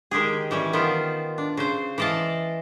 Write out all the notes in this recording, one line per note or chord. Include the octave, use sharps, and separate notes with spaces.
D#3 G#3 G4 G#4
E3 G3 C#4
D#3 B3 F4 B4 C5
D4
C#3 C5
E3 D5 D#5 F5 A5